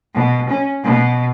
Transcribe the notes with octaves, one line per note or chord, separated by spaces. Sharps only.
B2
C#4
B2